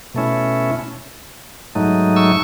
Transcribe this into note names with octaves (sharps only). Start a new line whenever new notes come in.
B2 A3 C#4 E4
G#2 F#3 A3 D#4
C#6 E6